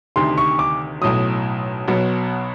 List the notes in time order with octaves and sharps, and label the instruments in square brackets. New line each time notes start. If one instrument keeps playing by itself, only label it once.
[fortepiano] D2 C3 D#3 [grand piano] C6
[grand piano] C#6
D6
[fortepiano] B1 A2 F#3 [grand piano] D#6
[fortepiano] B1 B2 F#3 B3